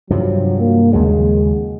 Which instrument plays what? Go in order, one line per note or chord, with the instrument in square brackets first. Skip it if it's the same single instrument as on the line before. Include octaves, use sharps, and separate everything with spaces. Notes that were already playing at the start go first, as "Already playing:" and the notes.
[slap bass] G2 C3 F3 [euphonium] F#3
[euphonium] A#3
[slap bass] D#2 C#3 F#3 [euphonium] G#3